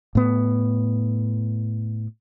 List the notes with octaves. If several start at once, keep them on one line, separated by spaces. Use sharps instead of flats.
A2 B3